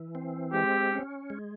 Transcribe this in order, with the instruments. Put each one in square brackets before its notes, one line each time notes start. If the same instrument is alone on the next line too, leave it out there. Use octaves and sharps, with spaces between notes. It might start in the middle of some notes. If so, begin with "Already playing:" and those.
Already playing: [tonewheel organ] E3
C4
[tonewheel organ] G#3 [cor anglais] G4
[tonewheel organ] C#4
G#3